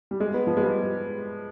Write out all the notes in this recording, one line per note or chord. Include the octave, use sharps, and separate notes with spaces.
G3
G#3
B3
F3
G#3
G3